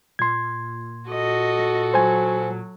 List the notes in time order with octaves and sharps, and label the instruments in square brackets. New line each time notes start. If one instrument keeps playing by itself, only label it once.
[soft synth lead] A#2 [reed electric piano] C6 G#6
[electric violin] F#4 A4 [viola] D#5
[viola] F#3 [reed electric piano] C5 G#5